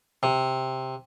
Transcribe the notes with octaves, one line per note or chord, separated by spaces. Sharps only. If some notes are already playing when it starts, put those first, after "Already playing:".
C3